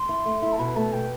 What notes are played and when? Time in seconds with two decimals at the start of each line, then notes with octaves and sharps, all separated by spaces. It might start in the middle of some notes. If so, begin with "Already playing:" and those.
Already playing: C6
0.09 E4
0.26 A3
0.42 E4
0.52 A5
0.58 B2 B5
0.76 A3 A5
0.92 B2 G5